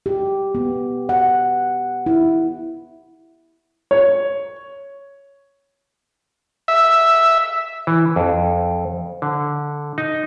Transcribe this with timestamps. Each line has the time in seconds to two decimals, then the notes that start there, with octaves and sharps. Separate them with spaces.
0.06 G4
0.55 B3
1.09 F#5
2.06 E4
3.91 C#5
6.68 E5
7.87 E3
8.16 F2
9.22 D3
9.98 D#4